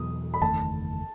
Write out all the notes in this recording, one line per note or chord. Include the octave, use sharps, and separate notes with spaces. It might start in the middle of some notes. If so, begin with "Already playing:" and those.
Already playing: E2 B2 F#3 D#6
B5
F#1 E2 D#3 A3 A5